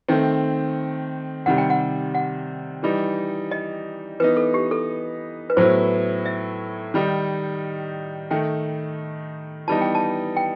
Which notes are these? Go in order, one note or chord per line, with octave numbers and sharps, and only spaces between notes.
D#3 A3 C4 D#5
C3 D#3 G3 F#5
G5
F#5
F#5
E3 G3 D#4
D#5
E3 B3 D#4 B4
A4
G4
A4
B4
A2 F#3 B3 E4 C5
E5
D#3 G3 D#4
D#3 A3 D#4 G5
E3 G3 B3 D#4 A5
G5
A5
G5